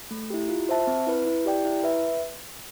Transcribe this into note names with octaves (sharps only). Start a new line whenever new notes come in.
A3
E4 G4
F4
C5 E5 A5
C4
E4 B4
E4
G4 D5 G5
E4
B4 E5